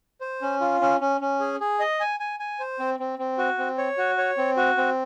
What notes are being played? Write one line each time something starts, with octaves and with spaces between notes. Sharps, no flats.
C5
C#4
F4
C#4
C#4
C#4
G#4
G#4
D#5
G#5
G#5
G#5
C5
C4
C4
C4
F#4
C4
C#5
F#4
C#5
C4
F#4
C4